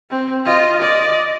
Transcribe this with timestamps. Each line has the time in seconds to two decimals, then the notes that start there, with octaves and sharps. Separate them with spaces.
0.11 C4
0.45 F4 D#5
0.79 D5 D#5